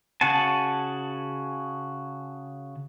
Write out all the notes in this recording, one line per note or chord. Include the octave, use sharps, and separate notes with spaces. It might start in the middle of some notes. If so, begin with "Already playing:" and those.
C#3 F#4 F#5 G#5 A5